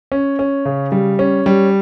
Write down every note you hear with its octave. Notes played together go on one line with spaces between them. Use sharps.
C#4
C#4
C#3
G3
C#4
G3